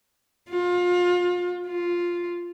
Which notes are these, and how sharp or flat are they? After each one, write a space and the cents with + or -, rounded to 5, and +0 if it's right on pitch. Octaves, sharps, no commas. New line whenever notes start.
F4 +30
F4 +0